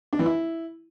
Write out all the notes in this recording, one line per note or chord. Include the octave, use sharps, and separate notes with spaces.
D4
E3
E4